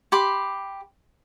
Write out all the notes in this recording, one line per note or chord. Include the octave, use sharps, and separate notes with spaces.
G4 B5 C6 D6